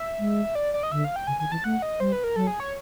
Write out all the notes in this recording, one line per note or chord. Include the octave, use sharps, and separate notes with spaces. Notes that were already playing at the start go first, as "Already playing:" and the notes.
Already playing: E5
G#3
D5
D5
D#5
D3 E5
F5
G5
C#3 G#5
D#3 G#5
E3 A5
A3 F#5
D#5
G3 C5
B4
A#4
F#3 A4
G#4
C#5